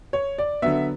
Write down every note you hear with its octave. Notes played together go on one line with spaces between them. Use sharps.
C#5
D5
D3 F#3 B3 E5